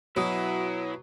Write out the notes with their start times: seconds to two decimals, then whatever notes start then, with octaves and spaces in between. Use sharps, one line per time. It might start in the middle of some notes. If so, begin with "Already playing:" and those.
0.16 B2 F#3 E4 F#4 D#6